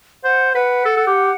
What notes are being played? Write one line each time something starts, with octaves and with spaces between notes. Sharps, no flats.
C5 F#5
B4 F#5
A4
A4
G4